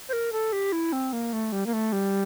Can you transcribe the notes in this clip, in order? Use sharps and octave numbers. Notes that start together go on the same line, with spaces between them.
C5
A#4
A4
G4
E4
C4
A#3
A3
G3
A#3
A3
G3